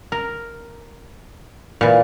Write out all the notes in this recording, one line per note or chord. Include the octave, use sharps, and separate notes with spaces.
A#4
A#2 E3